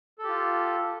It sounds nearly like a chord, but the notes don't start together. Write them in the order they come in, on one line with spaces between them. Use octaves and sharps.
A4 G4 F4